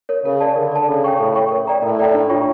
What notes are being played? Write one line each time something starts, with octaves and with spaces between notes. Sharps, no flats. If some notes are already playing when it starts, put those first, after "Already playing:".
A#4 C#5
C#3 A#4
D5 A5
D3 A#4
D5 A5
C#3 A4
C#5 G5 C#6
A2 A4
C#5 G5 C#6
A#4
D5 G5 A#5
A2 A#4
D5 G5 A#5
D4
F4 C#5 G5 C#6